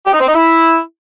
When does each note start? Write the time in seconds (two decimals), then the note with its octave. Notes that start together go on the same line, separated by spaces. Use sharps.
0.06 G4
0.13 D#4
0.20 C4
0.28 D#4
0.35 E4